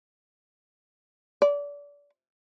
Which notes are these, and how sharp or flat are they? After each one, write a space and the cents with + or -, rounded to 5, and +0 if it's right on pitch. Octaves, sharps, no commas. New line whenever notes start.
D5 -30